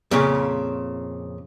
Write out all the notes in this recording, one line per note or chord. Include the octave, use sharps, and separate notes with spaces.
F2 A#2 C#3